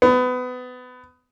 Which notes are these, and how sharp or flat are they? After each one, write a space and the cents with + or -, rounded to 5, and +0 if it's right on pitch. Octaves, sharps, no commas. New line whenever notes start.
B3 +25